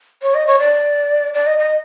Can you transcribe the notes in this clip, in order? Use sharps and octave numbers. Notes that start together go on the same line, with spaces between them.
C#5
D#5
C#5
D5
D5
D#5
D#5